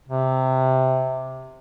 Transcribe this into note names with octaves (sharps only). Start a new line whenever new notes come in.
C3